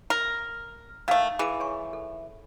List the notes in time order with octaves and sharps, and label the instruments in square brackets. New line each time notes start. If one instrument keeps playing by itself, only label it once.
[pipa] A#4
[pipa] D#3 A3 [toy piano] D#4 F5 E6
[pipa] E3 [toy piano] G#4 D6
[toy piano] C#5 G#5 C#6
A4